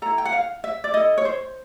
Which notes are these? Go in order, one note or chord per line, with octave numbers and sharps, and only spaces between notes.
E4 A4 A#5
G5
F#5
F5
E5
D5
E4 A4 D#5
C#5
C5